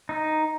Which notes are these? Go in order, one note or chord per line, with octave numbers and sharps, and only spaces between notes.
D#4